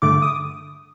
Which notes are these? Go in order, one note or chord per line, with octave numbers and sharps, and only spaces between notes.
G2 D3 A3 D6
D#6